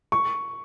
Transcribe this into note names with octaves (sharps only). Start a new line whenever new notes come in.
C#6